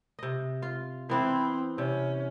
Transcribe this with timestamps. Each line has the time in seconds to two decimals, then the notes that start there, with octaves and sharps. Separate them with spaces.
0.19 C3 D#5
0.62 F4
1.10 E3 B3 C4 E4
1.78 C3 C#4